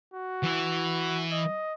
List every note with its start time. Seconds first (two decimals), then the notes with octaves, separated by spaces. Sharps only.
0.14 F#4
0.44 E3 E4
1.31 D#5